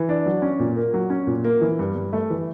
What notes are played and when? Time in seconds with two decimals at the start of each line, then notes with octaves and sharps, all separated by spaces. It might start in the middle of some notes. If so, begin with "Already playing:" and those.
Already playing: E3
0.09 D4
0.26 F#3
0.42 C#4
0.60 A#2
0.77 A#3
0.94 F#3
1.10 C#4
1.27 A#2
1.44 A#3
1.61 E3
1.79 G2
1.96 G2
2.13 A3
2.30 E3